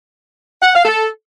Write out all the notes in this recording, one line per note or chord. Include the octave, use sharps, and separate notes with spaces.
F#5
F5
A4